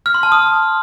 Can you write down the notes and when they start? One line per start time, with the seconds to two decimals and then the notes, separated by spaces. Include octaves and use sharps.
0.06 F6
0.14 C6
0.23 A5
0.32 D#6